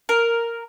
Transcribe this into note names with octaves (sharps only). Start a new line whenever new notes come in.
A#4